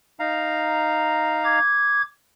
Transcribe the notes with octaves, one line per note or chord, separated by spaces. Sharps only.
D#4 F5 A#5
D6 G#6